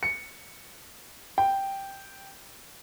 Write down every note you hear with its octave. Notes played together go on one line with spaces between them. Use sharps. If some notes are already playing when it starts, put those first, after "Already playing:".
C#7
G5